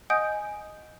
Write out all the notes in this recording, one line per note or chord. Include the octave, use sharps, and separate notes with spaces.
D#5 F#5 G#5 D#6 G6 D7